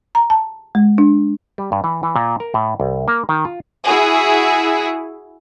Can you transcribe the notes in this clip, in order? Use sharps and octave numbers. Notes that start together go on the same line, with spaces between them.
A#5
A5
G#3
D4
G3
G2
E3
E3
A#2
A#4
A2
C2
A#3
D#3
F4
E4 F#4 G#4